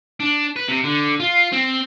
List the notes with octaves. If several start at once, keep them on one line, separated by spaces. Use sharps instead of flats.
D4
B4
C3
D3
F4
C4